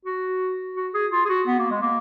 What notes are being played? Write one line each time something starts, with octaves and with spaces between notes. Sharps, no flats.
F#4
F#4
G#4
F4
G#4
F#4
B3
A#3
G#3
A#3